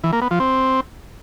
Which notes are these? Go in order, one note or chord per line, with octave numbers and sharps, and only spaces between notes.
E3
A#3
B3
F3
C4